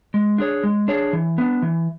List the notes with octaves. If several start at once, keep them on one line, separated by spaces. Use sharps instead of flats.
G#3
D4 G#4 C#5
G#3
D4 G#4 C#5
E3
B3 D4
E3